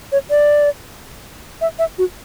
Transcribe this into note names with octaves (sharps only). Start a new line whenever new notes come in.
C#5
D5
E5
E5
F#4